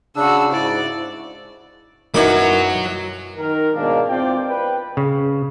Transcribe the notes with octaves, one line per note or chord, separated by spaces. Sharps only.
C#3 D4 F#4 E6
G#2 C#3 E4 C5 D5
F#2 F#3 A#3 D#4 E4 A#4 B4 B5
D#3 A#4
G#2 B2 D#3 A#3 D4 F5
E2 C4 F4 D5 G5
B4 G5
C#3